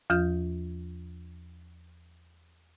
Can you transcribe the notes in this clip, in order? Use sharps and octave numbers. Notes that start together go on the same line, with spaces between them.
E2 F3 F4 G6